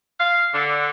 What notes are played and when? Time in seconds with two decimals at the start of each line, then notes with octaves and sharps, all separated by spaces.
0.20 F5
0.54 D3